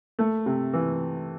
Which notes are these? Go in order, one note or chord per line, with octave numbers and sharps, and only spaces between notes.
A3
C3
E3